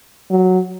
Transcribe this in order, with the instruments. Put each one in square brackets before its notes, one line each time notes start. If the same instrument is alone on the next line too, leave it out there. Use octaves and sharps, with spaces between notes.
[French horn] F#3